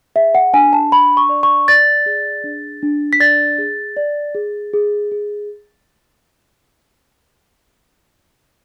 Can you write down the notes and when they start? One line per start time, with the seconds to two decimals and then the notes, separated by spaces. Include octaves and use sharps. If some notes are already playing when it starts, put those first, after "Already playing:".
0.16 G#4 E5
0.35 F#5
0.54 D4 G#5
0.73 A5
0.92 D4 B5
1.17 C#6
1.29 D5
1.43 C#6
1.68 D5 A6
2.06 G#4
2.44 D4
2.83 D4
3.13 B6
3.20 D5 A6
3.58 G#4
3.97 D5
4.35 G#4
4.73 G#4
5.12 G#4